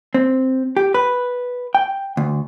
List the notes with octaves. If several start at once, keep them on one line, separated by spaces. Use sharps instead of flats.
C4
G4
B4
G5
D2